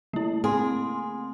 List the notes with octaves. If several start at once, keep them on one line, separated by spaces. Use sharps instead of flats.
C#3 G3 A3 A#3 E4
C4 G#4 C6